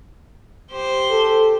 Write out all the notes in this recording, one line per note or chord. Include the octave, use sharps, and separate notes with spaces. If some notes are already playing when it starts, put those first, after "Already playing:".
G4 C5
A4